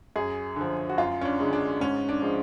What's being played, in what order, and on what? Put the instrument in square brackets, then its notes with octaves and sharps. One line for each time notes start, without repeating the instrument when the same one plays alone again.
[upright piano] F#2 G#4
D3 F3
F#4
F#2 F4
C#4
D4
D3 G#3
D4
G#2 C#4
D4
F3 G#3